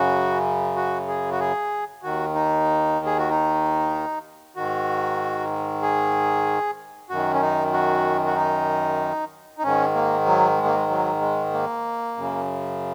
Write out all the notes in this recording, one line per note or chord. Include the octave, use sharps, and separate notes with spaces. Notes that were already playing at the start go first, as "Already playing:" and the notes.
Already playing: F#2 C#3 F#4
F#4
G#4
F#4
G#4
D#2 D#3 F#4
D#4
G#4
F#4
D#4
G#2 D#3 F#4
G#4
F#2 D#3 F#4
C#4
D#4
F#4
F#4
D#4
D#4
G#2 D#3 C#4
A#3
F#3
G#3
A#3
G#3
F#3
G#3
A#3
F#2 C#3